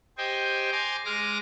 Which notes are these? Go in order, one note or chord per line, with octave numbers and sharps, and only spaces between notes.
G4 C5 D#5 G5 G#5
G#5 A#5 C6 D6
G#3 D#5 D6 F6 A#6